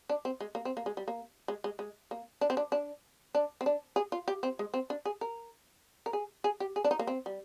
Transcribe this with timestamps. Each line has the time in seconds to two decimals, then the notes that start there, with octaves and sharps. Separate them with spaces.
0.09 D4
0.25 C4
0.41 G#3
0.55 A#3
0.65 C4
0.77 A#3
0.86 G#3
0.97 G3
1.08 A#3
1.48 G#3
1.64 G#3
1.79 G#3
2.11 A#3
2.41 D4
2.50 C4
2.57 D4
2.72 D4
3.35 D4
3.61 C4
3.66 D4
3.96 G#4
4.12 F4
4.28 G4
4.43 C4
4.59 G#3
4.74 C4
4.90 D4
5.05 G#4
5.21 A#4
6.06 A#4
6.13 G#4
6.44 G#4
6.60 G4
6.76 G#4
6.84 D4
6.91 D#4
6.99 A#3
7.07 C4
7.26 G3